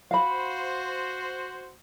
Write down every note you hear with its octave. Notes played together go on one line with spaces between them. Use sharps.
F#4 C5 F5 B5